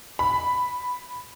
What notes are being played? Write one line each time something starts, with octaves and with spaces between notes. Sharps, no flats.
B5